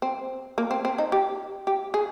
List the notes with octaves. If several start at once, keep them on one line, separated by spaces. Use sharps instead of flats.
C4
A#3
C4
C4
D#4
G4
G4
G#4